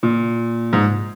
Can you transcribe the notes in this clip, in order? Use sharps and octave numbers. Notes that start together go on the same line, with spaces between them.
A#2
G#2